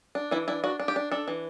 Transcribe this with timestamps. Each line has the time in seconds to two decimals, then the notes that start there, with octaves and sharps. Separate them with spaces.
0.15 D4
0.31 E3 E4
0.48 D4 E4
0.64 D4 F#4
0.80 D4
0.88 G4
0.96 D4
1.12 D4 A4
1.28 E3